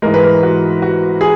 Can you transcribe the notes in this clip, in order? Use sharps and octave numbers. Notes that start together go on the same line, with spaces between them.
G#2 E3 G#3 A#4
B4
A#4
F#4
F#4
G#4